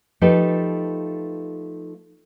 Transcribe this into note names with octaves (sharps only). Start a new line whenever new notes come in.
F3 A3 D#4 G4 A4 B4